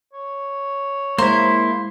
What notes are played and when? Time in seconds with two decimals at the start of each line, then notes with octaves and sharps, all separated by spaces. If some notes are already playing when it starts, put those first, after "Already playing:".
0.13 C#5
1.18 G#3 A#3 E4 C5